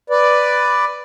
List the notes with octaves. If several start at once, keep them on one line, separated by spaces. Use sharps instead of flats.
B4 D5